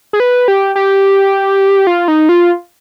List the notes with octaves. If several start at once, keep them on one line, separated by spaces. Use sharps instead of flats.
G#4
B4
G4
G4
F4
D#4
F4